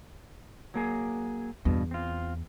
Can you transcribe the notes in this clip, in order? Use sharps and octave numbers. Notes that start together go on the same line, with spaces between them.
F#3 A#3 G#4
E2 G2 B2
C4 F4